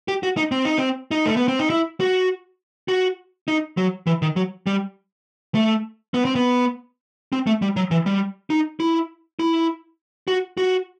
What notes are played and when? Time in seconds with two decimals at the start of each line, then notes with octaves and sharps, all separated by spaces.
0.08 G4
0.23 F#4
0.37 D#4
0.52 C4
0.65 D#4
0.78 C4
1.11 D#4
1.26 A3
1.36 B3
1.48 C4
1.59 D#4
1.70 E4
2.00 F#4
2.88 F#4
3.48 D#4
3.77 F#3
4.07 E3
4.22 D#3
4.36 F#3
4.67 G3
5.55 A3
6.14 B3
6.25 C4
6.35 B3
7.33 C4
7.47 A3
7.62 G3
7.76 F#3
7.91 E3
8.06 G3
8.50 D#4
8.80 E4
9.39 E4
10.28 F#4
10.57 F#4